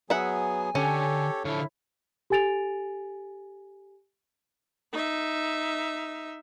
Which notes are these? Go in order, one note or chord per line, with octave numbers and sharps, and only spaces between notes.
F#3 B3 G#4 E5 F#5 G#5
D3 C#4 G4 A4 C#5
D3 F3 E4 A4 C#5 F6
G4 A4 G#5 A6 D7 F7
D#4 E5